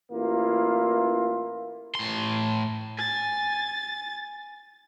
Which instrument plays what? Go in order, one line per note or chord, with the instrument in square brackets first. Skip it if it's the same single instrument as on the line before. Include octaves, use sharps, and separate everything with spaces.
[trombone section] A1 A#3 E4 F4
[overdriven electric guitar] A2 C6
[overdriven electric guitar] G#5 [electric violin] A6